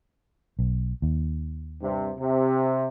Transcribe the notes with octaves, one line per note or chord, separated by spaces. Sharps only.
B1
D#2
G2 C3
C3